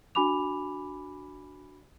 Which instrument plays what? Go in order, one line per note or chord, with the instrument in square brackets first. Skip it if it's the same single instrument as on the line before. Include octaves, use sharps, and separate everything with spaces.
[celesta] D4 F#4 G#5 B5 D6 F7